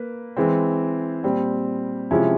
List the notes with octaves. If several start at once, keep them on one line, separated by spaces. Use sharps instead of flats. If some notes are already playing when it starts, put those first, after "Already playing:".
Already playing: A#3 B4
E3 G#3 C4
A#2 G3 C4
C3 F3 G#3 C#4 E4